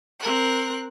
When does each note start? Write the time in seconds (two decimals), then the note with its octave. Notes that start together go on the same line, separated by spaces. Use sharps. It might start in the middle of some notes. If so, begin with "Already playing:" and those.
0.20 C4 A#4 F#6